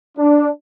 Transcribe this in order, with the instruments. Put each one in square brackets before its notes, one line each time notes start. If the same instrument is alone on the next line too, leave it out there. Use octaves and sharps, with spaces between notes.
[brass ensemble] D4